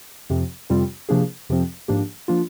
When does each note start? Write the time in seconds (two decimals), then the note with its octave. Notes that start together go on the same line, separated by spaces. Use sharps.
0.30 F2 C3 F3 C4
0.70 F2 C3 G3 C4 F4
1.09 C3 F3 A#3 D4 G#4
1.49 F2 C3 F3 C4
1.88 G#2 F3 A#3 D4 G4
2.28 F3 A#3 D4 F4